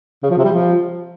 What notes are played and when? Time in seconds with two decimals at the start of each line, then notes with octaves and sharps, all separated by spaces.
0.23 C#3
0.30 F3
0.37 C3
0.45 G3
0.52 F3